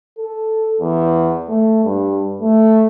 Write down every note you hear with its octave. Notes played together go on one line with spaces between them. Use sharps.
A4
E2
A3
G2
A3